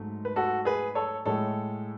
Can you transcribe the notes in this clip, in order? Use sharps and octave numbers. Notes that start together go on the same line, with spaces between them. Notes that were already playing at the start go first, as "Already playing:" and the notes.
Already playing: G#2 F#3 A3
B4
F#4 A4
G#4 B4
A4 C#5
A2 G#3 A4 C#5